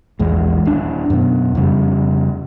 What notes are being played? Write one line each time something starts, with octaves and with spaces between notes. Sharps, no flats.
A#1 E2 G#3
D#1 D4
F#2 B2
F2 C#3 G3